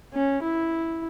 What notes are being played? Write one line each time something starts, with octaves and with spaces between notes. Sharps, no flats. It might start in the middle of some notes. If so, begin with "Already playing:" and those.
C#4
E4